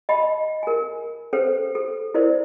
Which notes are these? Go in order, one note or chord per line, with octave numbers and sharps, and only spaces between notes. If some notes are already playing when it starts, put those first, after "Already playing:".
D#5 G5 A5 B5
A#4 G#5
C#4 A4 B4 C5 G5
A4
E4 A#4 C5 D5